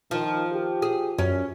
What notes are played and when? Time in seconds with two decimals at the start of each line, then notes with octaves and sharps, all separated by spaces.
0.11 D#3 F3
0.52 G4
0.82 G#4
1.18 F#2 C#4